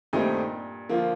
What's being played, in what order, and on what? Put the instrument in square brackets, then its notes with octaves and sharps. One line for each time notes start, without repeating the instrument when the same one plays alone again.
[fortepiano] G2 A#2 [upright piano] D#3 A3 C4 D#4 G4
[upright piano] D3 F3 A#3 F4